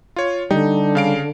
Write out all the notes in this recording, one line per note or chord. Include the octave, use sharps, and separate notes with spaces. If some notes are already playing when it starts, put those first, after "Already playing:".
F4 C#5
D3 G3 D#4
C#3 F5 D7